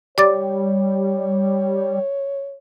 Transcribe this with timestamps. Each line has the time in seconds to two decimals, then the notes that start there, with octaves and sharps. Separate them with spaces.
0.18 G3 C#5 D5 D6 A6